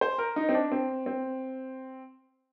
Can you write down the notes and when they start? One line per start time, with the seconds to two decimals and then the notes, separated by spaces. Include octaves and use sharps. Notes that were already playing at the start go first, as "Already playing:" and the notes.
0.01 C5
0.18 A#4
0.36 D#4
0.49 C4
0.54 D4
0.72 C4
1.06 C4